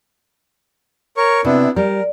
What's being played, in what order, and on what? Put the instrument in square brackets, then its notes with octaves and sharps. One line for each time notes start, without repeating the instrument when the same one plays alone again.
[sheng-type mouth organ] A#4 C#5 C#6
[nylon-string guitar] C3 [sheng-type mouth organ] B3 D4 E4
[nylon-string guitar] G3 [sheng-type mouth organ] A#4